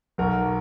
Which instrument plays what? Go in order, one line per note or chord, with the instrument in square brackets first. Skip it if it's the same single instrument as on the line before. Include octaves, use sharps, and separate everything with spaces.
[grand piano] B1 B2 F#3 A#4